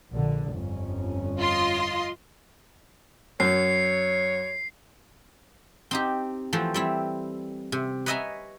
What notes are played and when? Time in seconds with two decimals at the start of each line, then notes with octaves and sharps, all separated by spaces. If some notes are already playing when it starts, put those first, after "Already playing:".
0.14 A#1 D3
0.52 G1 F2 C#4
1.38 F4 D#5 C6
3.40 F#2 C#5 C7
5.91 C4 D#4 G4
6.53 E3 F3 A3 C4
6.74 G3 C4 E4
7.72 C3
8.06 B4 C#5 D#5 E5 G#5 A#5